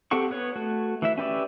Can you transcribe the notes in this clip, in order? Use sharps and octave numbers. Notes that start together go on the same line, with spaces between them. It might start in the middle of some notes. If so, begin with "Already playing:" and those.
C4 G4 A4 F#5 C#6
B3 B4 C#5
A3 F#4
E3 E4 E5
C#4 G4 B4 D5 E5